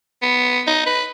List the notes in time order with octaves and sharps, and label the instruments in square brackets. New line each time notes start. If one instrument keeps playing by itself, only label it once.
[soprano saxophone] B3
D#4
B4